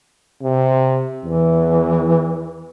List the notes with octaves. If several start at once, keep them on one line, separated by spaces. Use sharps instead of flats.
C3
E2 E3